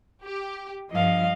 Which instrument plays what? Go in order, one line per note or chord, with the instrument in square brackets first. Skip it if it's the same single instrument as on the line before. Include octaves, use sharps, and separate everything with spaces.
[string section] G4
[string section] G2 F3 [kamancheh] D#5 F5